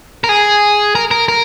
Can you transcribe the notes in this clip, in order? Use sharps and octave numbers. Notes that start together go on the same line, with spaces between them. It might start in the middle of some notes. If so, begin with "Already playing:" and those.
A#4
G#4
A#4
A#4
A#4